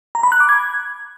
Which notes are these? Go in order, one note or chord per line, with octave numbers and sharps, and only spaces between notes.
A#5
B5
F#6
D6
G#6